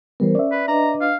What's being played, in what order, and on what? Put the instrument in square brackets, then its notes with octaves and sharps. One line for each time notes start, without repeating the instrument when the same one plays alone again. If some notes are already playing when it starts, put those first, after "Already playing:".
[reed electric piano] E3 G3 B3 [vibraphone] A#4 C5
[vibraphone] C#4 [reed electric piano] D5 E5
[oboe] B4
[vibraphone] D4 B4 D#5 [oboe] A#5
[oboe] F5